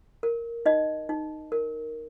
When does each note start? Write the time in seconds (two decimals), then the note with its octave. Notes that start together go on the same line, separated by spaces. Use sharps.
0.23 A#4
0.66 D#4 D#5
1.09 D#4
1.52 A#4